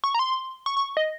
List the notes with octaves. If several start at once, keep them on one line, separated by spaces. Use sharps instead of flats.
C#6
A#5
C6
C#6
C#6
D#5